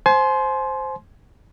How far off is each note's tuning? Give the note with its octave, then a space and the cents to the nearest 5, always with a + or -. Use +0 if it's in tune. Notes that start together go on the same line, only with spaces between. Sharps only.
C5 +0 G#5 +40 C6 +0